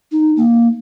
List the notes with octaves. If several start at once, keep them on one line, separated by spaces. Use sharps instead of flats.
D#4
A#3